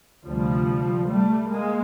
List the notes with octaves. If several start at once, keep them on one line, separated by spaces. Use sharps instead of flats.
D2 C3 F3 G3
G3 A3
G#3 A#3